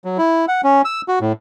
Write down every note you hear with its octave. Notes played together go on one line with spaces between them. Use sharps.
F#3
E4
F#5
C#4
E6
F#4
A2